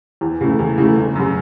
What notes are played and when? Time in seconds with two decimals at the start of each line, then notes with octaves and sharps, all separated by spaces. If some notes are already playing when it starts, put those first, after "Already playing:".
0.21 E2
0.41 C#3 E3 A3
0.59 E2
0.78 C#3 E3 A3
0.96 G1
1.15 F#2 C#3